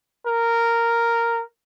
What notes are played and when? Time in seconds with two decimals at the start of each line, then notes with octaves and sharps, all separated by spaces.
0.27 A#4